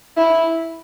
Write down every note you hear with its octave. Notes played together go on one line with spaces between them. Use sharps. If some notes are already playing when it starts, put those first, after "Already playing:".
E4